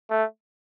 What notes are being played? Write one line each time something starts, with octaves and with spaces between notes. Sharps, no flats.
A3